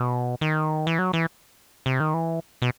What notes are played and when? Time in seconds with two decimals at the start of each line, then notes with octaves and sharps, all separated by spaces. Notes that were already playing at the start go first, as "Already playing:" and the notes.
Already playing: B2
0.41 D#3
0.87 E3
0.99 F#3
1.13 E3
1.86 C3
2.00 D#3
2.14 E3
2.62 B2